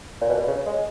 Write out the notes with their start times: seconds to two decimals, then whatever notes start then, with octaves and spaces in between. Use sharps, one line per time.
0.21 A#2
0.29 B2
0.48 C#3
0.66 G#3